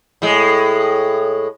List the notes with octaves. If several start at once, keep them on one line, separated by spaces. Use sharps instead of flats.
A2 G#3